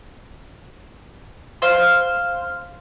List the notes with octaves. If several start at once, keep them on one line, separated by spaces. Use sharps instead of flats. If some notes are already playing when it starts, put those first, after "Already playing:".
C5 F5